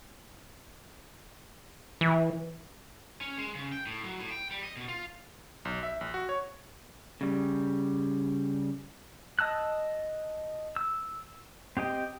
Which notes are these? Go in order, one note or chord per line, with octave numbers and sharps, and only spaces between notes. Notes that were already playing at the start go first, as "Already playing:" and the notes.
E3
C#4
G#3
C#3
G5
A2
F#3
A2
G5
G3
D#5
B2
F4
B1
E5
A#1
F#4
C#5
C#3 G3
D#5 A5 E6 F#6
E6
C4 G4 D#5 G5